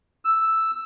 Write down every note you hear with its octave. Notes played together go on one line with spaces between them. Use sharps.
E6